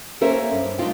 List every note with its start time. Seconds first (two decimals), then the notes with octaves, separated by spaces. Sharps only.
0.21 A#3 C#4 A4 A#4 C5 E5
0.51 G2
0.78 G#3 A3 D4 D#4 F4 G5